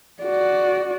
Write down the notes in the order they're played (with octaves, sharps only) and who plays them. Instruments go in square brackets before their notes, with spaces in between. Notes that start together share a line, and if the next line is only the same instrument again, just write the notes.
[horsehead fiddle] F#4 D5